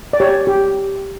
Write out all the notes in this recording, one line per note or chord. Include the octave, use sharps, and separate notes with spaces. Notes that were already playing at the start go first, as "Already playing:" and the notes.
D5
G4 C#5
G4